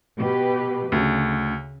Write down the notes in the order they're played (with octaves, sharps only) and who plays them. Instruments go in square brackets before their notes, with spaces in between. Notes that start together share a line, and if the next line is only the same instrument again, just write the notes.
[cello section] B2 G4 B4
[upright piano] D2 [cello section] C#3